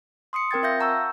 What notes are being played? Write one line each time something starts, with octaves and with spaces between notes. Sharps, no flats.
C6 D#6 C7 C#7
C4 A#4 G5 G#6 A6
F4 E5 F5 G6 A#6
F#5 A5 A#5 C#6 E6 G6